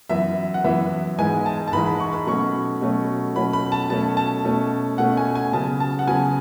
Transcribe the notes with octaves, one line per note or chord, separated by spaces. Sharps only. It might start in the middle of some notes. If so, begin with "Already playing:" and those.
F#2 E3 B3 E5
F#5
F#2 E3 B3 E5
G#2 E3 G#3 G#5
A5
A5
G#2 E3 G#3 B5
B5
C#6
B5
B2 F#3 A3 C#4 C#6
B2 F#3 A3 C#4
B2 F#3 A3 C#4 B5
B5
A5
B2 F#3 A3 C#4 A5
A5
B2 A3 C#4
B2 A3 C#4 F#5
G#5
G#5
C#3 F#3 B3 A5
A5
F#5
C#3 F#3 B3 G#5